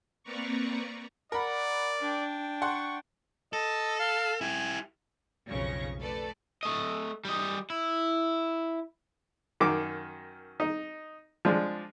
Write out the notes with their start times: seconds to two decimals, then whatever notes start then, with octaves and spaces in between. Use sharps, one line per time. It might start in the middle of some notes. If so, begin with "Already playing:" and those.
0.23 A#3 C4 B4 D5 A#5 C#6
1.32 A#4 D5 F#5 B5
2.01 D4 G5
2.62 F#5 C6 C#6
3.53 A4 D#5
3.99 F5
4.41 E4 G4 G#5
5.49 B1 F2 C#3 C#4 C#6 A#6
6.00 A3 A4 B4 D5
6.63 A3 D#5
7.25 G3 D#5
7.70 E4
9.60 F#2 D#3 D6
10.60 D#4
11.45 F3 G#3 D4